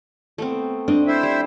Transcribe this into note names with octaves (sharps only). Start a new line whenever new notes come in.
A3 B3 C4
C4 D4 D#5
E4 C5 E5
G3